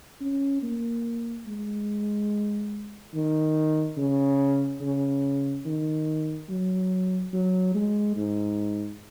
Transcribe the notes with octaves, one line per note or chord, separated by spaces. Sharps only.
C#4
A#3
G#3
D#3
C#3
C#3
D#3
F#3
F#3
G#3
G#2